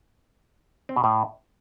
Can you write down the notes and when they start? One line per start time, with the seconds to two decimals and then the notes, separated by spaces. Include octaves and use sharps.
0.89 C4
0.96 B2
1.04 A2